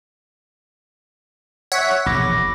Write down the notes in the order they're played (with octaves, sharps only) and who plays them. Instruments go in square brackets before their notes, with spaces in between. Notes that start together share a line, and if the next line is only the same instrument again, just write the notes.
[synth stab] C#5 E5 F#5
[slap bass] E1 A#1 [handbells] B5 D6 A#6